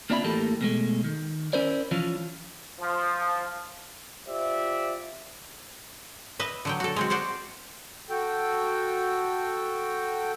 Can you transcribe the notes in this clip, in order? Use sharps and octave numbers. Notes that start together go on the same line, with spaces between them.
A#3 C4 D4 F4 E5 B5
A2 E3 A#3 G4 A4
B2 G#3 A3
D#3
C#4 E4 A#4 C5 D5
E3 F3 C#4 F4
F3
F4 G4 C5 D5 E5
B4 D#5 E5
D3 F#3 G5
F#4 A4
G#3 C4 F#4
F#4 C5 D5 F#5
F#4 A4 G5